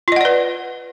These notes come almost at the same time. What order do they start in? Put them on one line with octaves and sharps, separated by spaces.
F4 D#5 F#5 D5 B4